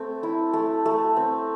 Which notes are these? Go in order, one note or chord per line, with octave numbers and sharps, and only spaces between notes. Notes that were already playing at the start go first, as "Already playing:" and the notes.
Already playing: A3 C4
E4
A3
A3
C4